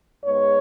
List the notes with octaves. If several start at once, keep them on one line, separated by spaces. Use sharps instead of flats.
G#2 G#3 B3 C#5